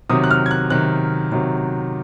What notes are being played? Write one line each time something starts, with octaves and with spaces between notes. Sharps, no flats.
C3 D#3 F#3 D#6
F#6
F6
G#6
F#6
C3 D#3 F#3 F#6
C3 D#3 F#3